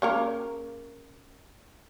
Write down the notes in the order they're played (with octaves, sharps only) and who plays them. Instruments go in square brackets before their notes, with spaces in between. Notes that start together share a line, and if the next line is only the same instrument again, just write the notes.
[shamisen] C#3 A#3 A#4